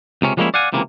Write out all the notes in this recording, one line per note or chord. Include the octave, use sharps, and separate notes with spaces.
C#2 C3 C#4
F3 G3 G#3 A#3 C#4 E4
D5 F5 F#5 G#5
C#2 C3 E3 A#3